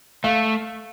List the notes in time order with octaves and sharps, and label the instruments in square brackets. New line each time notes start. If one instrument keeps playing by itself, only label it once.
[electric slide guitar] A3 [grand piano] F5